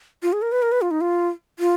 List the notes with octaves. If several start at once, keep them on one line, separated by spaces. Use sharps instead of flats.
F4
G#4
A#4
B4
A#4
B4
F4
D#4
F4
F4